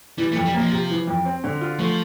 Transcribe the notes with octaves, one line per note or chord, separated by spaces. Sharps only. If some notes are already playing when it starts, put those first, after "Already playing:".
E3 G3
A3
F2
G3
F3 A#3
C3
E3
F2
C4
D3
F4
F3 A3